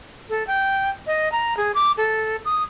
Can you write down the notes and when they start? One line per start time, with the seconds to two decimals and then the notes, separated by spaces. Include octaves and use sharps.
0.30 A4
0.47 G5
1.07 D#5
1.32 A#5
1.57 G#4
1.75 D6
1.98 A4
2.45 D#6